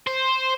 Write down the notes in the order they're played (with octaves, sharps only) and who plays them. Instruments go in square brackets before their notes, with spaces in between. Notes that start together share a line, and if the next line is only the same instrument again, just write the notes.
[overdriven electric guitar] C5